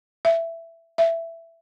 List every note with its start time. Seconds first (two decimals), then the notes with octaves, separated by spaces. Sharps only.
0.25 E5
0.98 E5